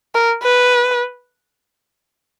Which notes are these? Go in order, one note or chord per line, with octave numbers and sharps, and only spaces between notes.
A#4
B4